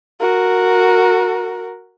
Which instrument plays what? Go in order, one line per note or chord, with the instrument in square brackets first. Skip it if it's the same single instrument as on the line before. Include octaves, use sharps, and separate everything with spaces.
[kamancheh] F#4 A#4